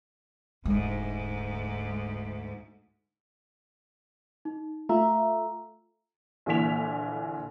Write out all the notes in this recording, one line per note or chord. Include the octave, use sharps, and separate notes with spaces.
E1 D2 G#2 G#3
D#4
A3 F4 E5 A#5
A#1 A#2 D3 E3 B6 F7